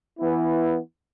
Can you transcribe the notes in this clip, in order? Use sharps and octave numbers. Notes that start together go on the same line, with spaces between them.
E3 B3 E4